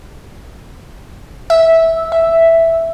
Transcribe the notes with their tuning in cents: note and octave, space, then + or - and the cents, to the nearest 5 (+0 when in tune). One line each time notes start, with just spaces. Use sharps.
E5 -10
E5 +0